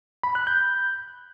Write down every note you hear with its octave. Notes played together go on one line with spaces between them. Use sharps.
B5
F#6
G6